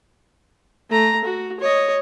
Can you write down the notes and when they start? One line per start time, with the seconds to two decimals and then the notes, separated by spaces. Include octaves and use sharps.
0.90 A3 A#5
1.24 F#4
1.60 C#5 D#5